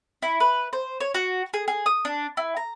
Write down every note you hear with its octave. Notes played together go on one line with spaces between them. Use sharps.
E4
B4
C5
C#5
F#4
G#4
G#4
D#6
D4
E4
A#5